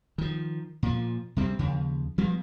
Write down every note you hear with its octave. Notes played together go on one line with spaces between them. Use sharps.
D#3 F3
A#2 F3
C3 G3 G#3 C4
D#2 C#3 F3
F3 G3 G#3 B3